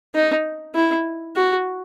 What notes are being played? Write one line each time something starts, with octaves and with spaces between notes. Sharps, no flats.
D#4
E4
F#4